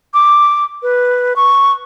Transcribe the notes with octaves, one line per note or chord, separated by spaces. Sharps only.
D6
B4
C#6